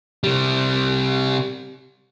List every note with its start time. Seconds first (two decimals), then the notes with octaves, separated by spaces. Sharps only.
0.24 C3 G3